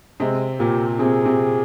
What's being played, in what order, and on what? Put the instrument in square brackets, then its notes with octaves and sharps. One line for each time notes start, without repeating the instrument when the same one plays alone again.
[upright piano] C3 C4 [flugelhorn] G#3
[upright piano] A#2 A#3 [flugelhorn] G4
[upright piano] C3 C4 [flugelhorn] G#4
[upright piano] C3 C4